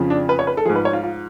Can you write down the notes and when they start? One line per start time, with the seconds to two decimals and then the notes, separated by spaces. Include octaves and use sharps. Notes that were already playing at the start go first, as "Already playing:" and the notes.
Already playing: F2 C#3 F3
0.10 D4
0.29 B4
0.39 C#5
0.47 B4
0.57 A4
0.65 F3 G#4
0.69 G#2
0.76 B4
0.85 C#5
0.93 F4
1.03 F4